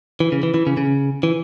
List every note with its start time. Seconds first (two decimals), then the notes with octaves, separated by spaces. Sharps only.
0.20 E3
0.32 C#3
0.43 E3
0.54 E3
0.67 C#3
0.77 C#3
1.23 E3